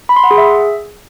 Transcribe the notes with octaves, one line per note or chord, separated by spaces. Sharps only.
B5
C6
F#5
G#4
E5